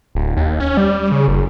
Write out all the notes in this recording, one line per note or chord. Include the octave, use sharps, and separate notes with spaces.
D1
D#2
C#4
G3
C#3
F#1